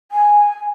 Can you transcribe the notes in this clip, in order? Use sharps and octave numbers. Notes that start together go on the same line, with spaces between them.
G#5